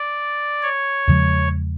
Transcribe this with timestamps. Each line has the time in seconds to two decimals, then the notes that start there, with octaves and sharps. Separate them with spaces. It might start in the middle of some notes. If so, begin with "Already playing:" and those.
Already playing: D5
0.63 C#5
1.08 E2 C#3 F3 G#3